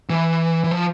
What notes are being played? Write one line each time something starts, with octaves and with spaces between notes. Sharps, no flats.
E3
E3
F3